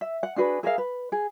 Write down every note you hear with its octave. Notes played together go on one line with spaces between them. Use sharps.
E5
F#5
D4 F#4 G#4 B4
G#4 A#4 E5 F5
B4
G#4